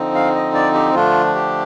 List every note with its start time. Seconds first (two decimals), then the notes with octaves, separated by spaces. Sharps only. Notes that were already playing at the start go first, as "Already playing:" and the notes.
Already playing: D3 F3 C4 D#4
0.15 F5
0.36 D#5
0.55 D5
0.74 G4
0.94 D3 F3 A3 D4 F4
1.35 G4